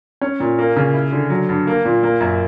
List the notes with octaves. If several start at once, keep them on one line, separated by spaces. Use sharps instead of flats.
C#4
A#2
A#3
C#3
E4
D3
F#3
G2
A#3
A#2
A#3
F#2